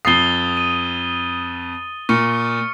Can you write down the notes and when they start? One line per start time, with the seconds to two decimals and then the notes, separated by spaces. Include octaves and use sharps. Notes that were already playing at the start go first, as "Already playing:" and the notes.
0.05 F2 D#6 A6 C7 G7
0.57 D#7
2.09 A#2 C#6 F6 C#7